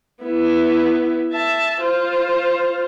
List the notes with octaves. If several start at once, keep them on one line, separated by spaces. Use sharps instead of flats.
B3 E4
E5 A5
F4 C5